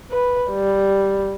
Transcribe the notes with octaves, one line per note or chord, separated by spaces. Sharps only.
B4
G3